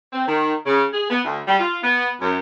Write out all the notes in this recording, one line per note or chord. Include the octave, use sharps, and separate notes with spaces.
C4
D#3
C#3
G#4
B3
D2
G3
F4
B3
F#2